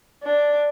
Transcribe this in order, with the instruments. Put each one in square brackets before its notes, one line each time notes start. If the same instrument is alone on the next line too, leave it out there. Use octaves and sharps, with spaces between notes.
[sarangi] D4